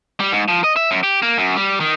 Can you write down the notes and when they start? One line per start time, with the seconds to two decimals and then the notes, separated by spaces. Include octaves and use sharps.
0.20 G3
0.32 G#2
0.48 F3
0.64 D#5
0.76 E5
0.91 F#2
1.03 G4
1.22 A#3
1.38 F#2
1.56 G3
1.80 D#3